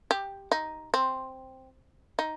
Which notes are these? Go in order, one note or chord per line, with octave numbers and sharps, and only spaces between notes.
G4
D#4
C4
D#4